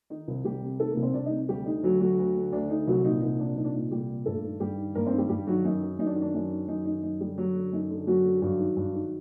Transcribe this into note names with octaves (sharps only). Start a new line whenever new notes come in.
D#3 D#4
C2
C2 G3 G4
C3
D#3 A3 A4
A#3 A#4
C2
C4 C5
C2 D4 D5
C3 D#4 D#5
D2 G3 G4
D3 D#4
D2 F#3 F#4
D3 F#3 F#4
D2
D3
D2 D4
D3 D#4
C2 F#3 F#4
A#2 D#4
C2 D#4
A#2 D4
C2 D#4
D4
A#2 D#4
C2 G3 G4
A#2
G2 A3 A4
D#3
G2 G3 G4
D#3
G2 A#3 A#4
C4 C5
D#3
G3 G4
G2 G3 G4
D#3 F#3 F#4
F#2 D#4
D#3
F#2 D#4
D4
D#3
D4
F#2
D#3
F#2 D#4
D#3 D#4
F#2 D#4
D3 G3 G4
F#2 F#3 F#4
D3
F#2 D#4
D3
F#2 F#3 F#4
D3
G2 F#3 F#4
D#3
G2
D#3